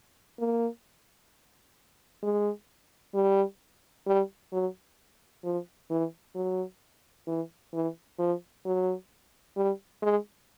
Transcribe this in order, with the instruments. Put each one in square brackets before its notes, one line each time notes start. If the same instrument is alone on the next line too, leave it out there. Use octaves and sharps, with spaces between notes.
[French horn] A#3
G#3
G3
G3
F#3
F3
E3
F#3
E3
E3
F3
F#3
G3
G#3